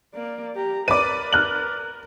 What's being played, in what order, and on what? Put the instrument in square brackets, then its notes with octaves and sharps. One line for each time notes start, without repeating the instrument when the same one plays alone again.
[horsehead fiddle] A#3 D5
G4 A#5
[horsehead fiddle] A#4 [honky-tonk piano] B4 D5 [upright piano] D6 D#7
[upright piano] F6 F#6 F#7